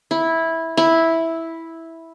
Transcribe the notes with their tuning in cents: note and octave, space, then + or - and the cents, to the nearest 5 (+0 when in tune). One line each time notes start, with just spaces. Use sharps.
E4 -10
E4 -5